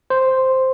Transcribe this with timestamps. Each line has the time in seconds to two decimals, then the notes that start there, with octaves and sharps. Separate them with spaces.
0.10 C5